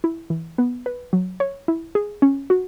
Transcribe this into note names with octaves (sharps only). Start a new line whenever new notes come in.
E4
E3
B3
B4
F#3
C#5
E4
G#4
C#4
F#4